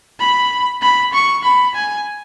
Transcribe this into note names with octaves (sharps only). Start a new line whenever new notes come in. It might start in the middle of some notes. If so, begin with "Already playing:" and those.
B5
B5
C#6
B5
G#5